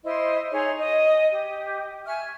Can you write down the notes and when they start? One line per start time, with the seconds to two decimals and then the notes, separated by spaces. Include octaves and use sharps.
0.04 E4 C5 D#5 C6
0.51 D#4 G#4 C#5 C6
0.78 D#5
1.30 G4
2.06 E5 G#5 C#6 F6